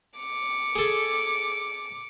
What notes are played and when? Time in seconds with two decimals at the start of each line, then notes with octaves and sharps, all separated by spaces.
0.19 D6 C#7
0.75 G#4 A4